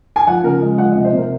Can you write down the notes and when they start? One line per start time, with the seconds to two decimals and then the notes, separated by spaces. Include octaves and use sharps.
0.16 G#5
0.27 F3 F#5
0.44 C#3 A#4
0.61 G#3
0.78 F3 F#5
0.91 D#5
0.95 C3
1.04 C5
1.12 C3 A#4